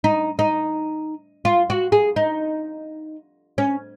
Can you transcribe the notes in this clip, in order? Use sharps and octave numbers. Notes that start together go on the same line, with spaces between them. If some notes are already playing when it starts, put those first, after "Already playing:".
D#4
D#4
F4
F#4
G#4
D#4
C#4